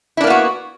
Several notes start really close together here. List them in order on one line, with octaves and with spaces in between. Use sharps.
E4 D4 A#3 B3 F#4